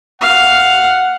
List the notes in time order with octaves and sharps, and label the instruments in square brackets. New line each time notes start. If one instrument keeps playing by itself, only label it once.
[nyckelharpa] F5 [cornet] F#5